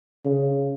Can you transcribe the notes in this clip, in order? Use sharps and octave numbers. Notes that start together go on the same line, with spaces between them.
C#3